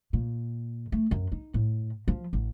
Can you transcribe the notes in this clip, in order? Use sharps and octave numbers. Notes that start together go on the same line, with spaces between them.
A#2
A3
F#2
D#4
A2
F3
A1